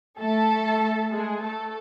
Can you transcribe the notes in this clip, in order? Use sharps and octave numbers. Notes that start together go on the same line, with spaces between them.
A3 A4
G#3 G#4
A3 A4